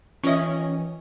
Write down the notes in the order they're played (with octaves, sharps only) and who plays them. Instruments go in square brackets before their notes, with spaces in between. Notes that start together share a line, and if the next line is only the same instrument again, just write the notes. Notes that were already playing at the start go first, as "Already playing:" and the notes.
[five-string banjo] D#3 D#5 [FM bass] E3 [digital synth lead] C#4 [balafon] F4 E5